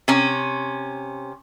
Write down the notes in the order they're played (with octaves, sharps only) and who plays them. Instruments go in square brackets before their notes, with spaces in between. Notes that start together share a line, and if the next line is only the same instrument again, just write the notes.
[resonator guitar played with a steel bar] C3 C#4